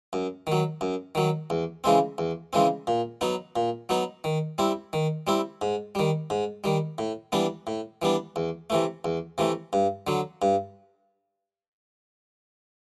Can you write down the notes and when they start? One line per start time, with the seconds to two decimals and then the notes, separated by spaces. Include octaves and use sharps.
0.13 F#2
0.47 D#3 F#3
0.81 F#2
1.15 D#3 F#3
1.50 E2
1.84 C#3 E3 G#3 C4
2.18 E2
2.53 C#3 E3 G#3 C4
2.87 A#2
3.21 F#3 B3 D#4
3.56 A#2
3.89 F#3 B3 D#4
4.24 D#3
4.58 G3 C4 E4
4.93 D#3
5.27 G3 C4 E4
5.62 G#2
5.95 D#3 G3
6.30 G#2
6.64 D#3 G3
6.98 A2
7.32 E3 G3 B3 D4
7.67 A2
8.02 E3 G3 B3 D4
8.36 E2
8.70 C3 E3 A3
9.05 E2
9.38 C3 E3 A3
9.73 G2
10.07 D3 F#3
10.42 G2